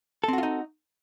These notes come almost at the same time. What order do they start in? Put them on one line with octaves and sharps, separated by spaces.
A4 C4 F#4 F4 D#4